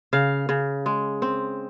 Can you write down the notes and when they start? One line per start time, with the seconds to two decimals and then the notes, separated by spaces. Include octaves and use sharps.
0.13 C#3 F5
0.49 C#3
0.86 G#3
1.22 C4